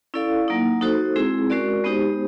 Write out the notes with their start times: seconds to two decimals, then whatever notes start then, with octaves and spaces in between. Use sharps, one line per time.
0.14 C#4 E4 A4 D5 F5
0.48 F#3 A#3 D#4
0.81 D#4 F#4 A4 C5
1.16 G#3 C4 E4 G#4
1.50 G#3 C#4 F#4 A#4 D5
1.84 G#3 B3 D#4 G4 C5